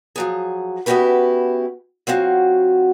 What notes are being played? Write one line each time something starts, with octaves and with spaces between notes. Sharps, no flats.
F3 F#3 G#4
B3 C#4 E4 F#4 G4 B4
F#3 C4 F4 F#4